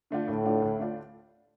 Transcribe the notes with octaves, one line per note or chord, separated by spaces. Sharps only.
D3 A3 D4 F4
D2 A2
D3 A3 D4 F4
D2
D3 A3 D4 F4